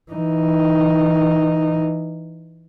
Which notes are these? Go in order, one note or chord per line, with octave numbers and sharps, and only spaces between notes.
E3 D#4